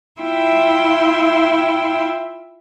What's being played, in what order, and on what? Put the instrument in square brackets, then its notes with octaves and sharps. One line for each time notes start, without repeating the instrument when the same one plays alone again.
[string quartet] E4 F4 E5 G5 C6